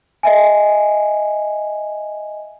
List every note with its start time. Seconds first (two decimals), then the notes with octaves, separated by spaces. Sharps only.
0.23 D#5 E5 G#5